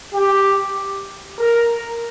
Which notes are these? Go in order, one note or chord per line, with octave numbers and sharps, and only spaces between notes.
G4
A#4